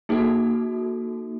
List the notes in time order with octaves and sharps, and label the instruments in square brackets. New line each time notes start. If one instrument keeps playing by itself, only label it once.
[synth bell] A#3 D#4 F#4 A4